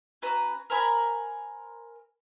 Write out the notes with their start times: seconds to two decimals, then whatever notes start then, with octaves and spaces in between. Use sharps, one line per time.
0.22 C#4 F#4 B4 A#5
0.70 A#4 C5 G#5 B5